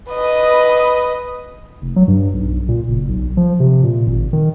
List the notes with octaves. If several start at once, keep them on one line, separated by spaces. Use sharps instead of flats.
B4 D#5
F1
F#3
G2
B1
A#2
F#1
B1
F3
C3
A#2
G#1
D#3